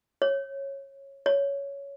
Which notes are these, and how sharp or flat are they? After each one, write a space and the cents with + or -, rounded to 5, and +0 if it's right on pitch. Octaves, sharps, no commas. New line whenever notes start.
C#5 -20
C#5 +10